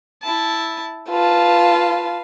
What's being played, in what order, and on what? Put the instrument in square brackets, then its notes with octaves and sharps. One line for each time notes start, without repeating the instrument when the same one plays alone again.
[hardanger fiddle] E4 A5
[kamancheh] F4 A5 [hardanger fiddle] B4 F5